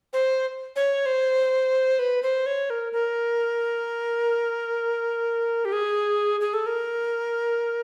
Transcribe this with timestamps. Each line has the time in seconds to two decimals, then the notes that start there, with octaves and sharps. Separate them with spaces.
0.13 C5
0.76 C#5
1.06 C5
1.99 B4
2.23 C5
2.46 C#5
2.70 A#4
2.93 A#4
5.65 G4
5.72 G#4
6.41 G#4
6.54 A4
6.66 A#4